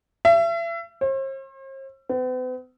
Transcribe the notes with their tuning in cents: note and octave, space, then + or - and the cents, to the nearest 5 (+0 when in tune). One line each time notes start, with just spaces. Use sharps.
E5 +35
C5 +45
B3 +45